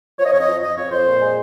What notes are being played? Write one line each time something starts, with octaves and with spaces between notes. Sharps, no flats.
F3 C#5
D#5
F2 C#5
D#5
F3
F3 D#5
F2 C#5
F2 C5
A#2
G#3